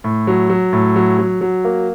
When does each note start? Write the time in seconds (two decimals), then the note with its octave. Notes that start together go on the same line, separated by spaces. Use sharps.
0.04 A2
0.27 F#3
0.50 F#3
0.73 A2
0.96 F#3
1.18 F#3
1.41 F#3
1.64 A#3